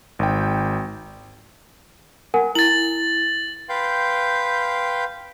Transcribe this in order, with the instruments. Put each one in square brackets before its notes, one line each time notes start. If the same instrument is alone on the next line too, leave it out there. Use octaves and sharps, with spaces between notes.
[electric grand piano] G#1 G5
[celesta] A#4 F#5 G#5
[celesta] E4 [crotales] A6 F#7
[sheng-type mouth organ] B4 F5 G5 C6 G6